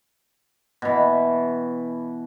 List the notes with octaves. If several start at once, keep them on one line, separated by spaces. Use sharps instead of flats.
B2 E3